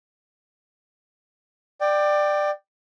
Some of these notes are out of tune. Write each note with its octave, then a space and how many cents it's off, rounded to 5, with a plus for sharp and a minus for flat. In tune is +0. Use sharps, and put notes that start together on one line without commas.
D5 +20 G5 -5